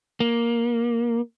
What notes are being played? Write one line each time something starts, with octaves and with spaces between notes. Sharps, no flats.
A#3